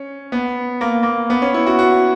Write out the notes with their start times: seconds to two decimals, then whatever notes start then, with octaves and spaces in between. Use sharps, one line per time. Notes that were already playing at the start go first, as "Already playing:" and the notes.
Already playing: C#4
0.32 B3
0.81 A#3
1.03 A#3
1.30 B3
1.42 C#4
1.54 E4
1.67 F#4
1.79 F#4